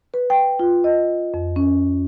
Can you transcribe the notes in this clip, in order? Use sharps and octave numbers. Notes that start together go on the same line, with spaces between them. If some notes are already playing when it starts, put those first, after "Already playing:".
B4
G5
F4
D#5
F2
C#4